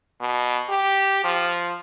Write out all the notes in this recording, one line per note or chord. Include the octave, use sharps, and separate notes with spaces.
B2
G4
F3